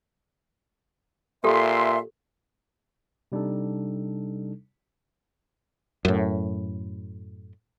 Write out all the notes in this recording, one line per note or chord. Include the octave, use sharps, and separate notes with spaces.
A#2 G4 A4 E5 C6
C3 G3 D4 D#4 A4
F#2 A2